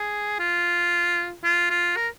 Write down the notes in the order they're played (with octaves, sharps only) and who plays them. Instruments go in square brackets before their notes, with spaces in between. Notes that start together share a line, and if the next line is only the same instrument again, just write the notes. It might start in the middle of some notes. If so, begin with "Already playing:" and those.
Already playing: [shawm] G#4
F4
F4
F4
A#4